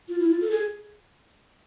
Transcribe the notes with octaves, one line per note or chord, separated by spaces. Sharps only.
F4
E4
F4
A4
G#4